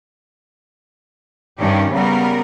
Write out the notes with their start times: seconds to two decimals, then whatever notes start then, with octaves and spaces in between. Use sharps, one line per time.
1.58 G2 D#3 C#4 G4
1.91 C#3 G3 B3 A#4